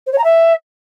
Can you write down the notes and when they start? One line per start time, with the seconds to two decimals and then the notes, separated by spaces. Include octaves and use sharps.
0.06 C5
0.12 C#5
0.18 A#5
0.24 E5